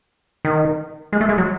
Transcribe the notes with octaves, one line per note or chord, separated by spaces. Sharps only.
D#3
G#3
A3
G#3
F#3